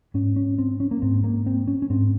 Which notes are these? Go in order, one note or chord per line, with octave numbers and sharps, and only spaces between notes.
G#2 C#4
C#4
C4
C#4
A#3
G#2 C4
A#3
C4
C#4
C#4
G#2 C4